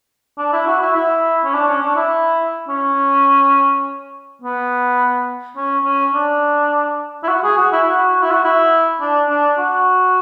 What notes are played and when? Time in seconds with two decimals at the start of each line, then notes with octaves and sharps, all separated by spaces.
0.38 D4
0.53 E4
0.67 F#4
0.82 E4
0.96 E4
1.45 C#4
1.54 D4
1.68 C#4
1.82 D4
1.96 E4
2.68 C#4
4.42 B3
5.57 C#4
5.85 C#4
6.14 D4
7.23 E4
7.28 F#4
7.44 G#4
7.57 F#4
7.72 E4
7.87 F#4
8.15 F#4
8.23 E4
8.31 F#4
8.44 E4
9.01 D4
9.30 D4
9.58 F#4